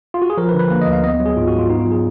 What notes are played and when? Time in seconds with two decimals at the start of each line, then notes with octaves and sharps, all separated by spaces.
0.14 F4
0.22 F#4
0.30 G#4
0.37 F3 A#4
0.49 B4
0.54 D3
0.59 B4
0.70 A#3 B4
0.81 D#5
0.87 D2
0.92 F5
1.03 B3 D#5
1.14 D#5
1.20 F#3
1.26 G#4
1.36 G#2 F4
1.47 F#4
1.53 G#2
1.58 F4
1.69 B3 D#4
1.80 F4
1.86 F#3
1.91 G#4